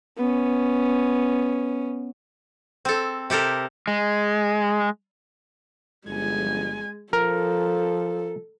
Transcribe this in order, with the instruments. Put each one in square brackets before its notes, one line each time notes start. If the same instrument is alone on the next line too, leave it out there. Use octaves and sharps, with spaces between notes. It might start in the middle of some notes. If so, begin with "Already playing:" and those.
[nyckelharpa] B3 C#4
[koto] C4 A4
C3 G4 A4 A#4
[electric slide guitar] G#3
[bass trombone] G1 [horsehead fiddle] G#3 G#5
[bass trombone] F3 [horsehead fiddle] A4 [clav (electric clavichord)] A#4